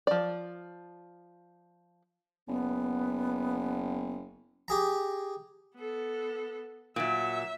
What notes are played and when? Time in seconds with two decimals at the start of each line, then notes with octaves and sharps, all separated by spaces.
0.07 F3 D5
2.48 F#1 B3
4.68 G4 G#4 A#5
5.76 B3 A4
6.96 A#2 F#3 E5